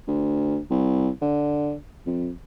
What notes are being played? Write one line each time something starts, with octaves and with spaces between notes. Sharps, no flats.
D2
C2
D3
F2